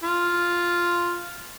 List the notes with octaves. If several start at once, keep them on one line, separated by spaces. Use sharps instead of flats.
F4